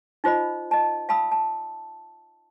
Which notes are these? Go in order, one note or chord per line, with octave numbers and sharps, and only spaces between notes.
D#4 F4 C5 D#5 B5
D#5 A5
F5 A5 B5 D#6 E6
A5